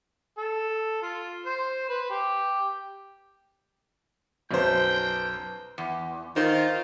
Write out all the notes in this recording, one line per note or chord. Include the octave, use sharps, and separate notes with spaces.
A4
F4
C5
B4
G4
B1 F#2 B4 C5 G5 A5
E2
D#3 D#4 F4 C5